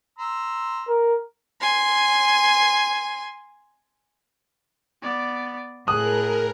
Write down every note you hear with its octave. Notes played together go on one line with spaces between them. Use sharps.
A#5 C6 E6
A#4
G#5 C6
B3 D5
A2 G#4 A#4 D#6 F#6